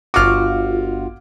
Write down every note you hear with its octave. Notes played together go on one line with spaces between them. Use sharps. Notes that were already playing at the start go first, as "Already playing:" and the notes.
G1 F4 F#4 D6 F6